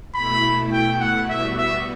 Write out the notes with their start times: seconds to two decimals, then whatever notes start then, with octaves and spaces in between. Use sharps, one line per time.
0.14 B2 A3 E4 B5
0.73 G5
1.01 F#5
1.29 G3 B3 F#4 E5
1.58 E5